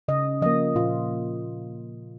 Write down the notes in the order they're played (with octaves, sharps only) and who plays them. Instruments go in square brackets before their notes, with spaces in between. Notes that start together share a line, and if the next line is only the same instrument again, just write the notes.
[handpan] C#3 D#5
F3 A#3 D#5
A#2 F4